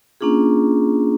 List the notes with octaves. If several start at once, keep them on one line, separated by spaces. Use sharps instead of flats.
A#3 C#4 D4 F4 G#4